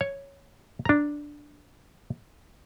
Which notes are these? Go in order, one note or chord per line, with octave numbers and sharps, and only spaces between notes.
C#5
D4 A#5